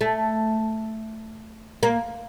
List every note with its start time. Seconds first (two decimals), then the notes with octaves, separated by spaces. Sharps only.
0.01 A3
1.83 A#3